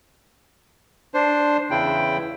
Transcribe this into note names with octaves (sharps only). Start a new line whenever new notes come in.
D4 C5
E2 C#3 E4 G5